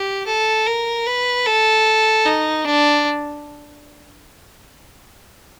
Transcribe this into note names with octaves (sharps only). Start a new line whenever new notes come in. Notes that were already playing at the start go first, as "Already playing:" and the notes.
Already playing: G4
A4
A#4
B4
A4
D#4
D4